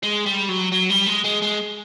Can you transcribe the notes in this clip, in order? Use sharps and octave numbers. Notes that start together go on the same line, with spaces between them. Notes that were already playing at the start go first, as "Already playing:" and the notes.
G#3
G3
F#3
F#3
G3
G#3
G#3
G#3